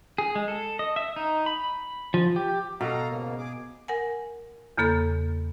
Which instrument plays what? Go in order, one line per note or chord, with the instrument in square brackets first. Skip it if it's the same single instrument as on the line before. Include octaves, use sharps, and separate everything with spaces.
[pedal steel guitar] G#4
G#3
A4
D#5
E5
D#4
B5
F3
G4
[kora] B2 [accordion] A4 F5 A#5
[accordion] G#2 C#3 A#3
G#4 D6
[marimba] A#4 F#5 G#5
E2 C#3 A#3 A4 B5